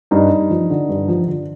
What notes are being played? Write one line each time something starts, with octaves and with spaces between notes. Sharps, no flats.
G2 D#4
G2
F3
D3
G2
F3
D3